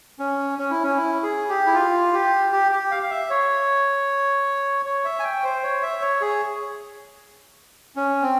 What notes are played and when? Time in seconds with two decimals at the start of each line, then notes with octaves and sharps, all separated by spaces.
0.19 C#4
0.59 C#4
0.71 E4
0.83 C#4
0.97 E4
1.23 G#4
1.49 G4
1.67 E4
1.74 F4
2.13 G4
2.52 G4
2.72 G4
2.91 F5
3.03 F5
3.10 E5
3.30 C#5
4.86 C#5
5.05 E5
5.20 G#5
5.24 G5
5.44 C5
5.63 C#5
5.82 E5
6.02 C#5
6.21 G#4
7.96 C#4
8.22 C4